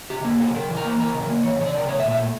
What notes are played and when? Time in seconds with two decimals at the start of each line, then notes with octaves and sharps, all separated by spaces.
0.10 C#3 G4
0.24 A#3 G4
0.40 C#3 A4
0.54 C#3 A#4
0.69 E3
0.77 A#4
0.84 A#3
0.99 E3 A#4
1.14 C#3
1.22 A#4
1.29 A#3
1.43 E3 C#5
1.59 C#3 C#5
1.66 D5
1.74 C#3 A#4
1.88 A3 C#5
2.00 E5
2.03 A#2
2.11 E5
2.19 A3